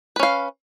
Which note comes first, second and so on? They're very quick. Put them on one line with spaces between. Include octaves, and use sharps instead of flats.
B4 C#4 F5